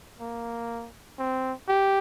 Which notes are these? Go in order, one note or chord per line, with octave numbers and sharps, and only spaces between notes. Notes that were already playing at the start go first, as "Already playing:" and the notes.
A#3
C4
G4